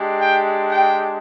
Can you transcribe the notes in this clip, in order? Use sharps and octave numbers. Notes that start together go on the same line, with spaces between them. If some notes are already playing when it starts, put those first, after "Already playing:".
Already playing: G#3 D4 G4
G5
G5